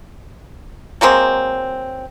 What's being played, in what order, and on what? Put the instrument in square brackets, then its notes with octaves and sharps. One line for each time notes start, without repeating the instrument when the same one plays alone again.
[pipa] F#3 G#3 A#3 C4